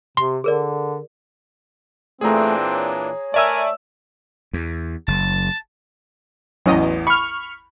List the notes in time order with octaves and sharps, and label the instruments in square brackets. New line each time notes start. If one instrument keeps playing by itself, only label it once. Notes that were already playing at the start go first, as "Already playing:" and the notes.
[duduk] C3 [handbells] C6
[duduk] D3 [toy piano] G#4 A#4 D5
[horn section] A#2 E3 D4 [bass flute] A3 [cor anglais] C4 [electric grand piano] G#4 A#5
[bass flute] C#5
[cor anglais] A3 [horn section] A#4 G#5 [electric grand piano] D5 E5 E6
[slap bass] E2
[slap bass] F#1 [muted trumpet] A5
[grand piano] A1 E2 [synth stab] F#3 C#4 D#5
[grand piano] B5 [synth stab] C#6 F6